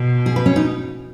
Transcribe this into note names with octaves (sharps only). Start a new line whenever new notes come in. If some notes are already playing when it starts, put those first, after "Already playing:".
Already playing: B2
G#4
B4
C#4
D#4